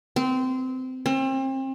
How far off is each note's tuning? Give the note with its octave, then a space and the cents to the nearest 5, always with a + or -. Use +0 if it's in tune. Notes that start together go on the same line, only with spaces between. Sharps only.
C4 -20
C4 +35